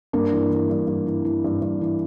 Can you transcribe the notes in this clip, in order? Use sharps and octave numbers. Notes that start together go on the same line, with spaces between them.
G2 A#3 D4
E3
E3
G2
G2
E3
E3
G2
G2
E3